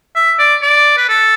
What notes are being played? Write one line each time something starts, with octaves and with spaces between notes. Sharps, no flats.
E5
D5
D5
B4
A4